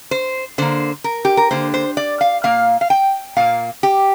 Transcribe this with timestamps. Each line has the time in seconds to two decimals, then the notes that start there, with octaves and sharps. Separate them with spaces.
0.11 C5
0.58 D3 A#3 C5
1.04 A#4
1.25 G4
1.37 A#4
1.51 D3 A#3 C5
1.74 C5
1.97 D5
2.21 F5
2.43 A#2 A#3 F5
2.81 F5
2.90 G5
3.36 A#2 A#3 F5
3.83 G4